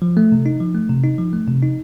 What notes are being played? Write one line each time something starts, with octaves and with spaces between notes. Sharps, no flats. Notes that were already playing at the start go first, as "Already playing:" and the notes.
F3
A3
C3
D#4
F3
A3
C3
D#4
F3
A3
C3
D#4